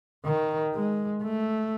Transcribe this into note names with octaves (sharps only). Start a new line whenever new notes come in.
D#3
G#3
A3